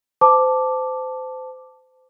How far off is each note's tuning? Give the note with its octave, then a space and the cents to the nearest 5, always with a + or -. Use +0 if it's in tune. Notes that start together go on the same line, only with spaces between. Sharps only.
C5 -30 A5 +0 D6 +0